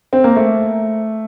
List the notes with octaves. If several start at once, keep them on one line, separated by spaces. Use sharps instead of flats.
C4
A#3
A3